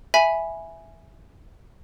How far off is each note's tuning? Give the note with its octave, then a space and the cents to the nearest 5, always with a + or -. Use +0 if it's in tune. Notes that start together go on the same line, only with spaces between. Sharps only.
E5 +0 G#5 +0 B5 +0